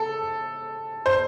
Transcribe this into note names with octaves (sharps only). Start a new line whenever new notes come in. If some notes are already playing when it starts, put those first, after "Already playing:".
Already playing: A4
C5